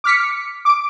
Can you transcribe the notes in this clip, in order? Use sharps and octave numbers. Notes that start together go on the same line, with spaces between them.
D6 F6 B6 C#7
D6 D7